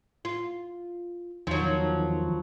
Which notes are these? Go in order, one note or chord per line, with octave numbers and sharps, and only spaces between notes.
F4
E2 D#3 F3 F#3